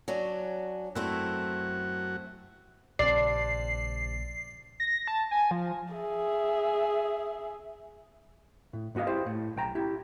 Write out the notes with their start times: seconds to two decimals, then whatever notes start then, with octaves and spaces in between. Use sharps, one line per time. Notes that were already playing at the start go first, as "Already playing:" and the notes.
0.08 F#3 C#4 D4
0.95 F#2 A3 C4 E4 F#4
2.99 A#1 C#3 G3 C4 D4 D5 C7
4.80 A#6
5.08 A5
5.31 G#5
5.51 F3
5.94 G#4 E5
8.73 A2
8.95 G#2 B3 F#4 D#5 F5
9.07 E4 G4 C5
9.26 A2
9.56 B1 G5 A#5
9.75 E4 G4